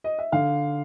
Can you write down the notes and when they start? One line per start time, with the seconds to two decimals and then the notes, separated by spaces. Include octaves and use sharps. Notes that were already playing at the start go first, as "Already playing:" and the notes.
0.04 D#5
0.19 E5
0.32 D3 F5